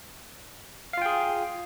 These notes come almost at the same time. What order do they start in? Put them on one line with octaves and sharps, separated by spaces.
F5 F4 G5 G#4